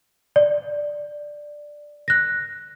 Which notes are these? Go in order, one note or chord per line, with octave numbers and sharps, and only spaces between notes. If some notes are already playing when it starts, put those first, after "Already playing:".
D5
F#6 A#6